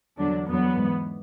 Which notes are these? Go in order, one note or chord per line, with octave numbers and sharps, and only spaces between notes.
E2 D3 F#3 D4
E2 D3 F#3 B3
G#2
E3